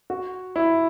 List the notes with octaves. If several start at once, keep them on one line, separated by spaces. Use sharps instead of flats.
F#4
E4